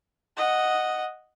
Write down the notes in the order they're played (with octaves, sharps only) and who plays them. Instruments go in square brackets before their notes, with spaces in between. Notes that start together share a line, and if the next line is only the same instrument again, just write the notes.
[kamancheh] D#5 F#5